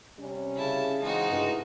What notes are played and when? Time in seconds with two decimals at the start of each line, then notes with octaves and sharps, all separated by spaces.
0.19 C3 G3 C#4
0.56 C#3 E4 A5
1.02 E3 G#3 C4 D#4 F#4
1.31 G2 C3 A3 E4